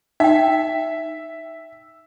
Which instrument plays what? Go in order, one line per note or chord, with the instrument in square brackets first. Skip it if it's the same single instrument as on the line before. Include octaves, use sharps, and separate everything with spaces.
[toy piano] D#4 G5 [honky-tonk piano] E5